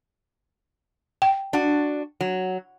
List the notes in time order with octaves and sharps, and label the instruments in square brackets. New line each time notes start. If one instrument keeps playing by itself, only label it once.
[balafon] G5
[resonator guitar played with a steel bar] D4 F#4
F#3